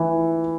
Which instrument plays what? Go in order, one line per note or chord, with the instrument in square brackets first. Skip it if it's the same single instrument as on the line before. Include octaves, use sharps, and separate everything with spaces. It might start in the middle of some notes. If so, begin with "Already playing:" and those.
Already playing: [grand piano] E3